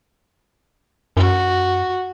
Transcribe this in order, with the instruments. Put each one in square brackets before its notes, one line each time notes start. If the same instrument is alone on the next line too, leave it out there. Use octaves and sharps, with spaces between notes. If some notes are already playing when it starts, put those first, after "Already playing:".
[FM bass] F#2 [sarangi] F#4